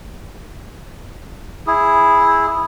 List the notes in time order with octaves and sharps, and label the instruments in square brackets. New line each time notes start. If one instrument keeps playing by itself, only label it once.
[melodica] E4 G#4